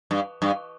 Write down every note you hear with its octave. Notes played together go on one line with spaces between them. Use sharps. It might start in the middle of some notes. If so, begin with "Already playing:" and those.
G2
G2